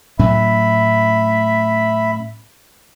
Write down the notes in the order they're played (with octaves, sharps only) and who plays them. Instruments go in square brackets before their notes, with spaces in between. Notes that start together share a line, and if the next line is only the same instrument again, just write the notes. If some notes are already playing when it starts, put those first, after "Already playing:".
[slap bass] A2 F#3 C#4 [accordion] E5 B5